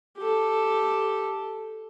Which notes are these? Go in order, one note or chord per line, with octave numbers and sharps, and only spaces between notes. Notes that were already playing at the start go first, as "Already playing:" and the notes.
G4 A4